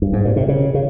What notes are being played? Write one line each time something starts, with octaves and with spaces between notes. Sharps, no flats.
G2
G#2
A#2
C3
C#3
C#3